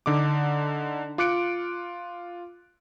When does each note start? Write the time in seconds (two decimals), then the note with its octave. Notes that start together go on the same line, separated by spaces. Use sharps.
0.06 D3 D#4 D6
1.18 F4 D6 F#6 C#7 D7